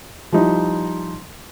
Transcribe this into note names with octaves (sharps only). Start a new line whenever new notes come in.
F3 G3 D#4 E4